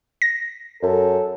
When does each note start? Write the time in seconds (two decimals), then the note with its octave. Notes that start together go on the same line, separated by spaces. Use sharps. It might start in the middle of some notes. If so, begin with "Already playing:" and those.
0.22 A#6
0.82 F#2 A4